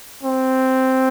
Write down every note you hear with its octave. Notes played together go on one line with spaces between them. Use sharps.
C4